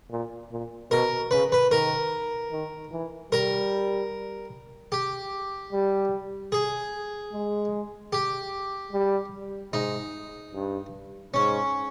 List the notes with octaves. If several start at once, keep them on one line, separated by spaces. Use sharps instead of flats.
A#2
A#2
B2 A#4
C#3 B4
B4
D#3 A#4
D#3
E3
G3 A#4
G4
G3
G#4
G#3
G4
G3
G#2 D#4
G2
G#2 C#4